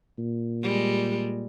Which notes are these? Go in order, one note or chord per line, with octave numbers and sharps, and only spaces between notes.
A#2
G3 G#3